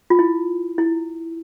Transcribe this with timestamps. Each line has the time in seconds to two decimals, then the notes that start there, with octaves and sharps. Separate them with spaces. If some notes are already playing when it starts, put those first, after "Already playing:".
0.10 F4
0.19 E4
0.78 E4